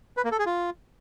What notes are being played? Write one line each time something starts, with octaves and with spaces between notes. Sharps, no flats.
B4
A#3
A4
G#4
F4